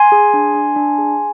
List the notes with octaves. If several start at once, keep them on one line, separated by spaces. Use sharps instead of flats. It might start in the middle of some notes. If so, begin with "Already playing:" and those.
Already playing: G#5 C6
G#4
D4
D4
D4
G#4